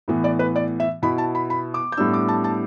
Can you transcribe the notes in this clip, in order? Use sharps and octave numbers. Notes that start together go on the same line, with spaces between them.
A2 E3 B3
D5
B4
D5
E5
B2 B3 E4 B5
A5
B5
B5
D6
G6
A2 G3 B3 D4 E6
D6
A5
A5